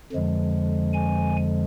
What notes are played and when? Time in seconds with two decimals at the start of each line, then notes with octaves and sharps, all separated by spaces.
0.12 F2 D3 F3 G#3
0.93 G#5